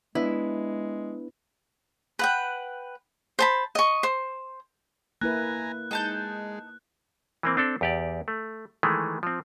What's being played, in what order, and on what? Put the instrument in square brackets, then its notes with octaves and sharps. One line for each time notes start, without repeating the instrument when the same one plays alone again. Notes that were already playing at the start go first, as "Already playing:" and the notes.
[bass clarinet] G#3 [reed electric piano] B3 D4 B4 [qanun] E4
[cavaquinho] B4 F#5 G5
C5 A5 B5
D#5 C#6
C5
[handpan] A#3 E4 B4 [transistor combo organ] G#5 A#5 [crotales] F#6
[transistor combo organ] G#3 [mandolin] D#4 A5 G6
[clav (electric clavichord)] E3 A#3 C4
C4 D4 A4
E2 G4 D5
A3
D#3 E3 G#3 A3
F3 C4